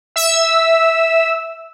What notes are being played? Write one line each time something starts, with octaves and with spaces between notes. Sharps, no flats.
E5 E6